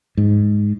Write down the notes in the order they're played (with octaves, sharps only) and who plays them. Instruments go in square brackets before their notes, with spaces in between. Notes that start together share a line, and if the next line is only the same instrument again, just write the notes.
[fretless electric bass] G#2